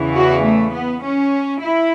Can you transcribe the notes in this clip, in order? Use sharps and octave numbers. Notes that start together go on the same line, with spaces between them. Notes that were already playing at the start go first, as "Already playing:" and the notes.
Already playing: E2 C#3 E3
F#4
A3
B3
C#4
E4